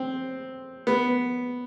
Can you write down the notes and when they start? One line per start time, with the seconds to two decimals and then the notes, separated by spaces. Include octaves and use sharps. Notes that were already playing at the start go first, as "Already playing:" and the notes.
Already playing: C4
0.87 B3